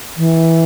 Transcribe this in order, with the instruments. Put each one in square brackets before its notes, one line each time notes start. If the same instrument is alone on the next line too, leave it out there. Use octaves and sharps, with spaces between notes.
[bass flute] E3